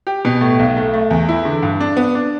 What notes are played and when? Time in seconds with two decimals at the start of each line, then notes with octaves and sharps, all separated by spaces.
0.07 G4
0.25 B2
0.41 A2
0.59 B1
0.77 A3
0.93 A3
1.10 E2
1.29 E4
1.45 D3
1.62 G2
1.80 D4
1.97 B3
2.15 D4